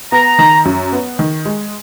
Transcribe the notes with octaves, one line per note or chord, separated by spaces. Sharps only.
B3 A#5
D#3
F#2
B3
D#3
G#3